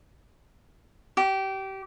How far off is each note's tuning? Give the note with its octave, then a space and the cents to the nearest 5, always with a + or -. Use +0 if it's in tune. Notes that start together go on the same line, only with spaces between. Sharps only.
G4 -25